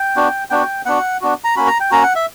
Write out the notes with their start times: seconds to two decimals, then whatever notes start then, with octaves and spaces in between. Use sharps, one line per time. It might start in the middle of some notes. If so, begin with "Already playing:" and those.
Already playing: G5
0.16 B3 D4 F#4
0.50 B3 D4 F#4 G5
0.86 B3 D4 F#4 F#5
1.21 B3 D4 F#4
1.44 A#5
1.56 A#3 C#4 F#4 B5
1.67 A#5
1.80 G5
1.91 A#3 C#4 F#4 A#5
2.03 F#5
2.15 E5